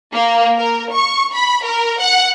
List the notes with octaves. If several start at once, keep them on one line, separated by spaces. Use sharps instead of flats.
A#3
A#4
C#6
B5
A#4
F#5